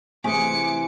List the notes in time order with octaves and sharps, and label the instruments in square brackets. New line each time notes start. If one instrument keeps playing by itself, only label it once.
[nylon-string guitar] C3 E3 [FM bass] A3 [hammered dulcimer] G#4 [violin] D6 C#7